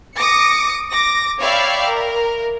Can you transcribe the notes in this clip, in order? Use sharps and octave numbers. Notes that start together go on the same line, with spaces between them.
D6 D#6 A#6 C#7
D6 A#6
C#5 D5 E5 F5 G5 B5
A#4